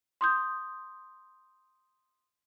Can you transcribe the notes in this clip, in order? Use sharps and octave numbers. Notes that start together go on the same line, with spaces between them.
C6 D#6 G6